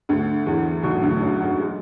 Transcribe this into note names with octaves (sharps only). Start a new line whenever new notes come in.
D2 D3
E2 E3
B1 B2
D2 D3
F#2 F#3
F#2 F#3
G#3